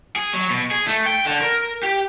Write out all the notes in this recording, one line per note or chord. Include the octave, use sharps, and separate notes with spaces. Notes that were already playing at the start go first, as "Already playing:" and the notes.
G#4
F#3
B2
G#4
A3
G5
D3
A#4
G4